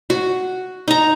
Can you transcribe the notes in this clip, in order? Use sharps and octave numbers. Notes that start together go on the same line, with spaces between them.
F#4
D#4 A#5